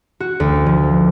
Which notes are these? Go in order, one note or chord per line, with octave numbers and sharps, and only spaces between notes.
F#4
D2
F3